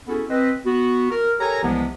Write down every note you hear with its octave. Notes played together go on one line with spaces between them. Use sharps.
B3 C#4 E4 F#4 G#4 A4
C4 B4 D#5
B3 F#4
A#4
G4 A4 A#4 C#5 G#5 A#5
C2 C3 E3 F3 G#3 B3